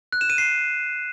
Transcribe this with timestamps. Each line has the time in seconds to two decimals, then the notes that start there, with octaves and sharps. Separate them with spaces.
0.12 F#6
0.21 E7
0.30 D#7
0.38 C7